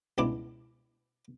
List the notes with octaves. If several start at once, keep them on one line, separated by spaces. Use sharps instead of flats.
C#2 B2 D4 E4 D6